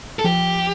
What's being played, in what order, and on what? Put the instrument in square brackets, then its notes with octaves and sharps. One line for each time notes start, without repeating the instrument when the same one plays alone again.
[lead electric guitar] A4
[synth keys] F3 [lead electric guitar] G4